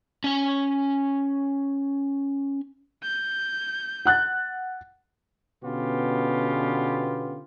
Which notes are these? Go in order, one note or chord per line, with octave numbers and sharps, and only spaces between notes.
C#4 G#5
G6
F#5 F#6 A6
B2 D3 B3 C#4 F4 G4